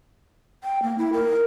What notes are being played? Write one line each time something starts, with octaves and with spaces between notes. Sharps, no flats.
G5
A#3
E4
A#4